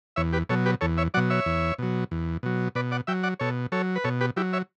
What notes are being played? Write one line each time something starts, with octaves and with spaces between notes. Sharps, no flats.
E2 C#5 E5
G4 B4
B2 F#3 A4 C#5
G4 B4
E2 A4 C#5
C#5 E5
B2 F#3 D5 F#5
C#5 E5
E2
B2 F#3
E2
B2 F#3
B2 B4 D5
D5 F#5
F#3 E5 G5
D5 F#5
B2 A4 C#5
F#3 A4 C#5
B4
B2 A4 C#5
G4 B4
F#3 E4 G4
C#5 E5